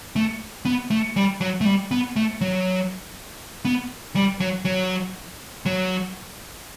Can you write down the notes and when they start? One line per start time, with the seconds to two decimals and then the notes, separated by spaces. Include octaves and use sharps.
0.16 A3
0.65 B3
0.90 A3
1.16 G3
1.41 F#3
1.61 A3
1.65 G3
1.91 B3
2.16 A3
2.41 F#3
3.65 B3
4.16 G3
4.40 F#3
4.65 F#3
5.66 F#3